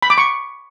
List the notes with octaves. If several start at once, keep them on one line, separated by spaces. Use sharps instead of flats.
B5
D6
C#6